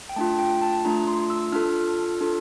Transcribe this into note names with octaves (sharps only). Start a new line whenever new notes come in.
G5
A3 D4 F4 A5
G5
A5
A3 D4 F4 A#5
C6
E6
D4 F4 A4 F6
F6
D4 F4 A4